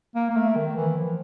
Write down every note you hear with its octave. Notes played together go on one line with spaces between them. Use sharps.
A#3
A#3
A3
D#3
E3
F3